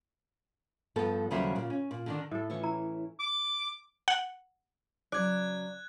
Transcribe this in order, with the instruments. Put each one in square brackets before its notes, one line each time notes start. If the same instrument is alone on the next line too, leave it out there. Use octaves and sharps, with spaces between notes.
[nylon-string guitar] G2 F3 B3 A4
D#2 C#3 F#3 G3 C5 E5
A#2 C#3
C#4
A#2
D3 D#3 D4
[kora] A2 A4 [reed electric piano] E5
[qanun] E3 C#4 C#6 [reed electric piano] A3 E4 F4
[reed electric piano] E4 [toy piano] A#5
[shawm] D6
[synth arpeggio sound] F#5
[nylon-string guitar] C#3 F#3 [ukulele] D5 [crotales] F#6 G#6